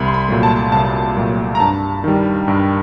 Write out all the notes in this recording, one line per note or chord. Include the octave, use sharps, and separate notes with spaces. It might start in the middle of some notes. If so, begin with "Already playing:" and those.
Already playing: C2 B5
C6
B5
A#2 F#3 A3
A5
C2 A5
A#2 F#3 A3
A#5
G2 A5
D#3 G3
G2